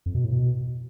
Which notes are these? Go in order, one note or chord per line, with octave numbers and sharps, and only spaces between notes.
F2
B2
A2
B2